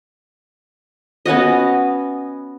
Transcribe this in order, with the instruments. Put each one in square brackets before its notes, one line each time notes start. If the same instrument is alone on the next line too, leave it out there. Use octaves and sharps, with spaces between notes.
[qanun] B3 C#4 F#4 D#5